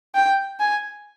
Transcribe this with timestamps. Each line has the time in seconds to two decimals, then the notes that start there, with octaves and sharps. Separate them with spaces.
0.15 G5
0.60 G#5